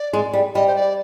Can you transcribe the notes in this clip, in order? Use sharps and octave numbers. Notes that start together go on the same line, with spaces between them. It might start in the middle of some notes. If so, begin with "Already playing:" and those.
Already playing: D5
G#3
G3
G3 D#5
C5
D5